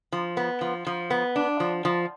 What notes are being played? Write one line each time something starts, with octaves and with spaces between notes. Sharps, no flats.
F3
B3
F3
F3
B3
D4
F3
F3